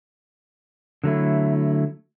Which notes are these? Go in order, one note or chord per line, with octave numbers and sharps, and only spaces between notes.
D3 F#3 A3 E4